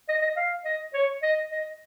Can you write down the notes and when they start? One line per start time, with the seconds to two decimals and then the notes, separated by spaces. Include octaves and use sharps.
0.08 D#5
0.22 D#5
0.36 F5
0.65 D#5
0.94 C#5
1.23 D#5
1.52 D#5